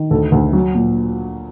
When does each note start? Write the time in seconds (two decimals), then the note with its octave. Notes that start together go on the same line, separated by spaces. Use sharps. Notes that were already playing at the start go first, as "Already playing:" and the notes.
Already playing: D#3
0.11 D2 A4
0.32 D2
0.53 F#3
0.75 A#2